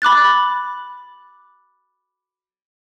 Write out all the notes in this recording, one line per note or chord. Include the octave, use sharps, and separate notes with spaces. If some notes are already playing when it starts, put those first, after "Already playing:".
B5 D6 F#6 A6